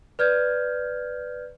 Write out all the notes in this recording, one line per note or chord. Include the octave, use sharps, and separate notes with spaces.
B4 D5 F6 G6 G#6